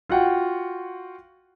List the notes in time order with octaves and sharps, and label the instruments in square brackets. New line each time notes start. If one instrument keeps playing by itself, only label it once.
[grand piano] F4 F#4 F#5 G5